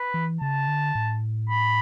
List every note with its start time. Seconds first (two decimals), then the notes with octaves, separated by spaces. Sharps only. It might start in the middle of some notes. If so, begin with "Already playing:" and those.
Already playing: B4
0.14 E3
0.41 C#3 A5
0.68 D3
0.95 A2
1.50 B5